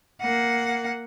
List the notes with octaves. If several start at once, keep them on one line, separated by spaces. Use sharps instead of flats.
A#3 F#5